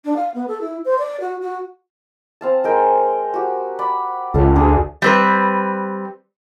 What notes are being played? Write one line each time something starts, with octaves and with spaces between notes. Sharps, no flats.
D4
F5
B3
A4
E4
C5
D5
F#4
F#4
C4 F5 A5
G#3 A#4 G5
F#4 G4
D5 B5
C#2 A4 F5
D2 D4 G#4
G3 C4 B4